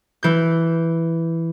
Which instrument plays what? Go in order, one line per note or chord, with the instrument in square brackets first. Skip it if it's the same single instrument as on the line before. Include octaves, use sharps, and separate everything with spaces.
[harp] E3 G6